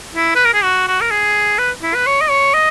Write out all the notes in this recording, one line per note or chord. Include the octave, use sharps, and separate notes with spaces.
E4
B4
A#4
G#4
F#4
F#4
A#4
G#4
B4
E4
B4
C#5
D#5
C#5
D#5